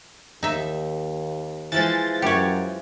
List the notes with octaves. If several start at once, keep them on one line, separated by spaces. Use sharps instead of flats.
D#2 D#4 E5
E3 F3 G#3 A6
F#2 G4 C#5